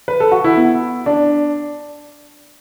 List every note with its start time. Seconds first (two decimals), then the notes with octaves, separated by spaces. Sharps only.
0.08 B4
0.20 A4
0.32 F#4
0.44 E4
0.57 B3
1.06 D4